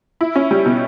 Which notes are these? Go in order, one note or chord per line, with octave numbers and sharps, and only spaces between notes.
E4
C#4
G3
B2